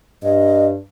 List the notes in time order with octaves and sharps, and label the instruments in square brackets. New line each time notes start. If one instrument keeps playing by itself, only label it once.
[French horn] G2 [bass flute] D#5